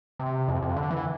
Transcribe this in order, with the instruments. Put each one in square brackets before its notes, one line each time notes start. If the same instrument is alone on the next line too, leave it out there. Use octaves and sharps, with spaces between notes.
[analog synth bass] C3
F2
F2
D3
E3